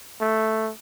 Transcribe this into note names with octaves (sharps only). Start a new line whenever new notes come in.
A3